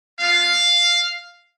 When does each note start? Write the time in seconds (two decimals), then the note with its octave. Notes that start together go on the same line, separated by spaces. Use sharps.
0.19 B3 F4 F5